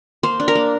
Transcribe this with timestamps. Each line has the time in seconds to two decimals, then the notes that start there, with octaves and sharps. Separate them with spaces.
0.23 A#3 C5
0.40 D4
0.48 A#4
0.55 A#3